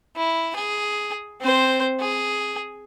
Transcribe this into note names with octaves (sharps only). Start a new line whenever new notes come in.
E4
G#4
C4 C5
G#4